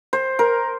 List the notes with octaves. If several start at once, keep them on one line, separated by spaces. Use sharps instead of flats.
C5
A#4